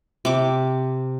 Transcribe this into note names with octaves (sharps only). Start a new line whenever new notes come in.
C3 D6